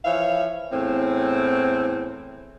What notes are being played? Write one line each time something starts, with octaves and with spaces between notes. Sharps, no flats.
E3 F3 C#5 E5 F5
E2 A2 C4